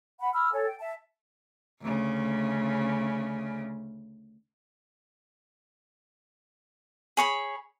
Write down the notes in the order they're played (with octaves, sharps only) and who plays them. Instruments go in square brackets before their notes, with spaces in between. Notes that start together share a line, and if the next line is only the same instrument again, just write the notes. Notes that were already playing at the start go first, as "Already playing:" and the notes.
[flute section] F#5 B5
B5 E6 F6
A4 C#5 G#5
G5
E5 A5
[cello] D2 C#3
[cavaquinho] G#4 C#5 B5